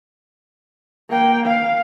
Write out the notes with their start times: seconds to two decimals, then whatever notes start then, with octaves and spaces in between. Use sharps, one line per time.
1.09 A#3 G5
1.46 F5